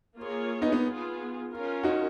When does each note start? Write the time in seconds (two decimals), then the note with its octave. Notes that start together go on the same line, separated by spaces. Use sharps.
0.16 A#3 F4 G#4 C#5
0.62 B3 D#4
0.72 B3 D#4
0.84 B3 F4 G#4
1.51 C#4 F4 A#4
1.83 D#4 F#4